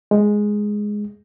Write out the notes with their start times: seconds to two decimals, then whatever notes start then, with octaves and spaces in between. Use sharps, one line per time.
0.11 G#3